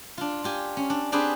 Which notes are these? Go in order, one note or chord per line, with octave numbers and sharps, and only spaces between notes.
D4 F4
F4 G4 G#5
C#4
D4
C4 D4 G4 G#4 B4 C5